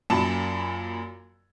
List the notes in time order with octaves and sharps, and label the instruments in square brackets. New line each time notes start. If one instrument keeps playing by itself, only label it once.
[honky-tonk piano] F#2 A#2 A5 B5